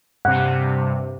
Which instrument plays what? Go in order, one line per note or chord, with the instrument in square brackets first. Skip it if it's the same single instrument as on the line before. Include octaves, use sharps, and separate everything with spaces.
[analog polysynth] G2 C3 [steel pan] F#5